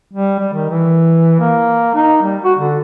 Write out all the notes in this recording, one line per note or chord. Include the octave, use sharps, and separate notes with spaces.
G3
G3
D#3
E3
A#3
D#4
G3
F#4
D3